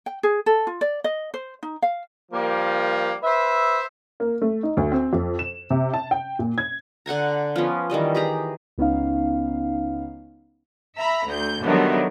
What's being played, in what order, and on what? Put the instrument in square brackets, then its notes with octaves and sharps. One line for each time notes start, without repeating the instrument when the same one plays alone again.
[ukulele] G5
G#4
A4
F4
D5
D#5
C5
D#4
F5
[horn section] F3 G3 A#3
B4 C5 E5
[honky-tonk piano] A#3
A3
D#4
D2
C4
F2
E7
C3
A5
G5
A#2
G#6
[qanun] D3 F#5 G#5 A#5
F3 B3 C#4
D#3 E3 G3 D#5
G4 G#4 A#5
[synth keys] C#2 B3 C#4 D#4 F5
[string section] E5 A#5 B5
D2 G6
D3 D#3 F#3 G3 A3 B3